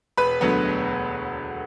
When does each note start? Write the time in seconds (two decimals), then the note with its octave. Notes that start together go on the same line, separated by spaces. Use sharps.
0.17 E1 B4 B5
0.41 D2 D3 F#3 B3
0.65 E1